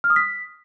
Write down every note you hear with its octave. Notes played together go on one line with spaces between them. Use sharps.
F6
D#6
B6